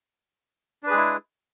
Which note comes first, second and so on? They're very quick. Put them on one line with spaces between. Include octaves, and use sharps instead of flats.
D4 B4 G#4 G#3 E4